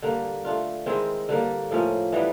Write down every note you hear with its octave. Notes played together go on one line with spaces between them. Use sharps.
D3 G3 A#3
A3 D4 F4
D#3 G#3 C4 E4
D3 G3 A#3
A2 F3 A#3 C#4
E3 G3 B3 D4